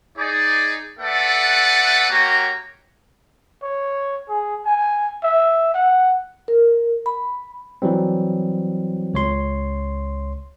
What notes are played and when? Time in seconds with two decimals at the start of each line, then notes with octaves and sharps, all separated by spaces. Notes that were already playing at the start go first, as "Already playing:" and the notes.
0.18 D#4 G#4 D5
0.99 A3 A4 B4 D5 E5 F#5
2.10 A#3 F#4 G4 C#5 A#5
3.63 C#5
4.29 G#4
4.65 G#5
5.23 E5
5.74 F#5
6.48 A#4
7.06 B5
7.82 E3 F#3 G3 C4
9.14 C#2 C#5 C6